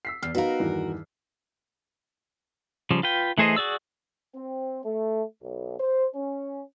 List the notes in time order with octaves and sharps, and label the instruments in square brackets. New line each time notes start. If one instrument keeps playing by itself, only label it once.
[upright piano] E6 B6 C7
[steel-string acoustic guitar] E2 [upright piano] F6 C7
[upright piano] B3 D#4 F5 [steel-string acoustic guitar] F#4 A#4
[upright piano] E2 G2 D#3
[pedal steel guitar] C#3 F3 G3
F4 B4 G5
E3 A3 G#4 C5 D#5
F#4 G#4 D5 E6
[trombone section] C4
A3
B1
C5
C#4